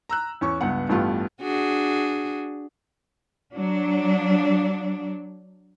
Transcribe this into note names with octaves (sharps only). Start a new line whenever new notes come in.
A#5 E6 F#6
E2 C#4 C#6
C#2 G2 B3 F#5
A1 G2 A3 B3 F4 G4
D4 F#4 G#4
F#3 D4